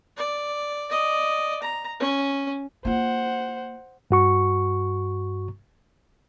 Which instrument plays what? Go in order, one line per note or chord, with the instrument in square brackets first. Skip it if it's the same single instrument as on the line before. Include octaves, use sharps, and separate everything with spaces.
[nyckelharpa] D5
D5 D#5
A#5
C#4
[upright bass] A#3 F4 [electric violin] C5 F#5
[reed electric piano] G2 F#4 C#6